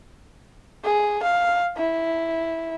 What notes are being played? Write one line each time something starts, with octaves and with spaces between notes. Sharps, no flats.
G#4
F5
E4